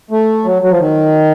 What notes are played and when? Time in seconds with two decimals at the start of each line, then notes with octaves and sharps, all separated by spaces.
0.11 A3
0.45 F#3
0.62 F#3
0.70 F3
0.78 D#3